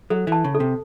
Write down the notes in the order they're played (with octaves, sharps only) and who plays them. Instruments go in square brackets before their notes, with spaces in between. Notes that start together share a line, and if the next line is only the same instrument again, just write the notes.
[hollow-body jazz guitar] F#3 [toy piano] A4
[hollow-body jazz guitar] E3 [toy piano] A5
[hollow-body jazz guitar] C#3
[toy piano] A4
[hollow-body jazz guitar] C3